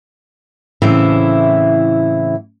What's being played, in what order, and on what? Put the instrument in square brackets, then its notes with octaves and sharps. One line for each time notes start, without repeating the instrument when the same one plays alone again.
[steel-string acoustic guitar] A2 C#3 E3 C4 E4